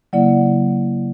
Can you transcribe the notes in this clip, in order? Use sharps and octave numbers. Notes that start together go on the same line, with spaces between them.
C#3 F#3 A#3 E4 D5 F#5